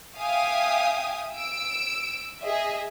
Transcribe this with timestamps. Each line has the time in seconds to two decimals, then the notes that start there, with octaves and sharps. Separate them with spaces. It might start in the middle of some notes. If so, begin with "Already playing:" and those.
0.17 E5 F5 G5 G#5 D#6
1.32 E6 D7
2.41 G#4 D#5 E5